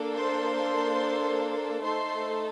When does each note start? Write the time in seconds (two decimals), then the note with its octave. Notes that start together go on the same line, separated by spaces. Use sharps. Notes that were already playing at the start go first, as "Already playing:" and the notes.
Already playing: A#3 D4 A4
0.16 C5 C6
1.82 A3 D#4 A4 C5 C6